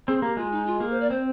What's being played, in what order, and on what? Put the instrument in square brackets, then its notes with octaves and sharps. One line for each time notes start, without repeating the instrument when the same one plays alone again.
[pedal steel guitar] C4 [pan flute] G#4
[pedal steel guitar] A#3 [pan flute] G4
[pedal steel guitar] G#3 [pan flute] F4
[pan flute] D#4
F4
[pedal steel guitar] A#3 [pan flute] G#4
[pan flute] C5
D5
[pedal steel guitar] C4 [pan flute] C5